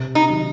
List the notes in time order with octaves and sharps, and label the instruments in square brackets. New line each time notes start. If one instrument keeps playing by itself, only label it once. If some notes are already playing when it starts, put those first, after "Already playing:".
Already playing: [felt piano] C3
[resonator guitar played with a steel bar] D#4
[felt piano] D#3 F#3